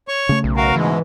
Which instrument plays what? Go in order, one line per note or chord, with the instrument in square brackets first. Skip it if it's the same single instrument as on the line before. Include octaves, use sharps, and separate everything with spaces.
[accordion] C#5 C#6
[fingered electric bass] C#3 A3
[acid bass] B1
[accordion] F#4 A#4 F5
[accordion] G#2 B2 G#3 [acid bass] E3